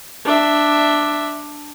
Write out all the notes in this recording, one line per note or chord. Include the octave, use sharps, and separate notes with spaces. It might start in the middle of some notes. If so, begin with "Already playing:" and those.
D4 E5